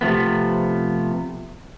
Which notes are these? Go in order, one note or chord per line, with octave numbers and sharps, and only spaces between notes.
C3 F3 A3 B3